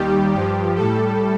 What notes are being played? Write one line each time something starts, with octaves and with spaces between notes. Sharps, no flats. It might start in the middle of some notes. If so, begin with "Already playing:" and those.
Already playing: D#2 D#3 G3 G4
G2 F3 G4
A2 G3 A4